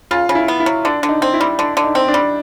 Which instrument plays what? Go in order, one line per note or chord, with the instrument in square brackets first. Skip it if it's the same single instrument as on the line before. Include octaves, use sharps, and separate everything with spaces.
[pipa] C#3 [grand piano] F4
[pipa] C#3
[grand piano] E4
[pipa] B3
[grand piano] E4
[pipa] F#3
[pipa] D3 [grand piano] D4
[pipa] D3
[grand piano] D#4
[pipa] C4
[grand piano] E4
[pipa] G3
[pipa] D3 [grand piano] D4
[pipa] D3
[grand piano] D#4
[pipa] C4
[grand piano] D4
[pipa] G3